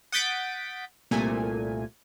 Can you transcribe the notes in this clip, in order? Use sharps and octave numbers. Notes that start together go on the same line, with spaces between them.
F#5 D#6 G6 A6 B6 D7
C2 A#2 A3 G#5